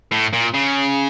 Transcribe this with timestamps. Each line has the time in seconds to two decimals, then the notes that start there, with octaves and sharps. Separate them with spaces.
0.12 A2
0.33 A#2
0.54 C#3